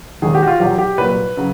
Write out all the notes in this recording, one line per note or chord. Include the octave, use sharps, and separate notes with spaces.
E1 D#2 D#3 G#3 G#4
G4
F#4
F4
E2 B2 F#3 G4
G4
C2 A#2 F#3 A#3 B4
C#3 F#3